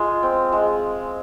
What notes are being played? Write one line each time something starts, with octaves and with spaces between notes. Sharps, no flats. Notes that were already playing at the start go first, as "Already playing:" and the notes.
Already playing: G#3 F4
C4
G#3